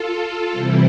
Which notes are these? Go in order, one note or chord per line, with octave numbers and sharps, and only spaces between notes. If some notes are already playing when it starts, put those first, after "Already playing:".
Already playing: F4 A4
C3 E3 G3 C4 E4